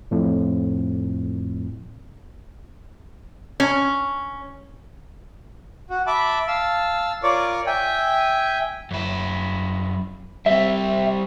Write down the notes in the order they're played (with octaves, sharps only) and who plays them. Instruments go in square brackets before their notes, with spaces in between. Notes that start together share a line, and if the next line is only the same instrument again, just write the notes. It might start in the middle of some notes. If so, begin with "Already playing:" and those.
[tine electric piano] F2 A2
[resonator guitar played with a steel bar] C#4
[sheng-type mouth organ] F#4
E5 A5 B5 D6
F5 A5 E6
F4 A#4 C#5 D5 C#6 D6
E5 G5 G#5
[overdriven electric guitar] F#2 E4
[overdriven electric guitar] G3 C4 [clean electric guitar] E5